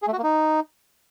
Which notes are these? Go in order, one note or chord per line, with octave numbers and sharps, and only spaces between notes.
G#4
A3
F#4
A#3
D#4